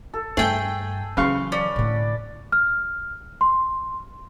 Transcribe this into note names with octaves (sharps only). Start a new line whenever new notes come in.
A4
G2 A3 G#4 G5
C#3 E3 F#3 B4 F5 C6 C#6
C#4 D5
A2 D3
F6
C6